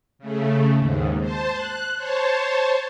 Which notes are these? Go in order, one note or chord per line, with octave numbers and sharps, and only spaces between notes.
C#3 A3
D#2 G#2
C5 A5
F#6
C5 C#5 A5